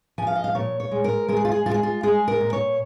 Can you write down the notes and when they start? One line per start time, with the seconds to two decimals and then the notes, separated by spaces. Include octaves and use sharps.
0.18 F3 G#5
0.27 F5
0.36 D#5
0.44 F5
0.55 A#2 C#5
0.80 C#5
0.91 G#3
1.04 A#4
1.28 G#3 A#4
1.37 G#4
1.45 F4
1.51 G#4
1.66 G#3 F4
1.74 G#4
1.83 F4
2.03 G#3 G#4
2.28 A#4
2.41 A#2
2.53 C#5